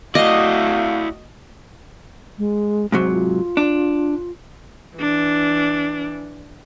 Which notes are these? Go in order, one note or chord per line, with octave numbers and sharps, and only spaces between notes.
A3 E4 F#4 D5 D#5 F5
G#3
G#2 C3 F#3 C5
F4
D4
E3 D4